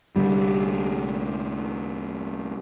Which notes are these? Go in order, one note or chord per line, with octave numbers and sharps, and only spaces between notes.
C2 D3 G3